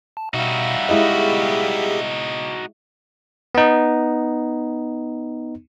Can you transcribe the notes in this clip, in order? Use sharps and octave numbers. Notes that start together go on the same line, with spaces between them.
A5
B2 G3 D#4 F#4 E5 F5
G#3 E4 G4 G#4 D#5
B3 D#4